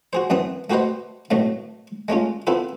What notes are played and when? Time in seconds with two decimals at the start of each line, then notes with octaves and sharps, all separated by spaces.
0.13 F#4 G#4 C5
0.30 F#2 E3 B3 C4 D#6
0.70 A3 F#4 G4 B4 C5 D#5
1.31 B1 A2 D#3 F#3 A3
2.08 G#3 A3 C#4 F4
2.47 B3 C4 E4 F4 A4